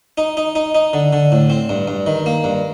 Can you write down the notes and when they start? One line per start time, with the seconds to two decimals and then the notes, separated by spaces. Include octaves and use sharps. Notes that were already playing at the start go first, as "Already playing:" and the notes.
0.18 D#4
0.37 D#4
0.55 D#4
0.75 D#4
0.93 D3
1.13 D3
1.32 A2
1.50 C4
1.69 G2
1.88 G2
2.06 D#3
2.26 A#3
2.44 G2